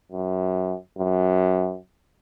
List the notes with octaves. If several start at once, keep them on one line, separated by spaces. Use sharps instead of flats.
F#2
F#2